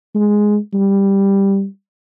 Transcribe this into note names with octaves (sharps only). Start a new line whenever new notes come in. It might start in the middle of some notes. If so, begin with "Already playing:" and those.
G#3
G3